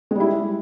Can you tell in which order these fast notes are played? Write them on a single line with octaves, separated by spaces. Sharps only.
G#3 G3 E4